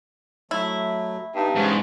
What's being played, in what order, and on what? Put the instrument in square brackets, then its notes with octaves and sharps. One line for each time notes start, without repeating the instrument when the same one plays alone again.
[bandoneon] F#3 A3 [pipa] E4
[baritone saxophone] G2 [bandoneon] B3 D#4
[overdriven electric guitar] G#2 [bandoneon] E3 B3 C#4